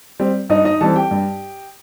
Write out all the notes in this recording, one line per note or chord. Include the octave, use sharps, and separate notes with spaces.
G3 C4
G2 D#4 D#5
D#4 D#5
E3 G3 C4 A4 A5
G4 G5
G2